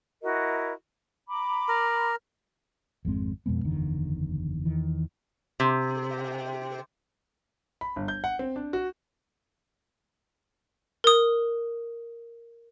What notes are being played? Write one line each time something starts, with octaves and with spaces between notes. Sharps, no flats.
E4 F#4 A#4 D#5
A#5 B5 D6
A#4
G#1 F2 G#3 C4
F2 B2 G#3 B3
F#1 E2 D3 D#3
E2 D#3 E3
C3
B5
G1
G6
F#5
C4
D4
F#4
A#4 D#6